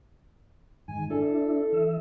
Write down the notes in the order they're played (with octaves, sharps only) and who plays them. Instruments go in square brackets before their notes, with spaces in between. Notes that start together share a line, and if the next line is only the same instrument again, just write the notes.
[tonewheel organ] G#2 D#3 [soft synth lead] G#5
[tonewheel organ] D4 E4 [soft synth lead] A4
[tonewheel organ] E3 E5